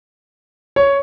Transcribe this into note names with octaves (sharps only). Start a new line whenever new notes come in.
C#5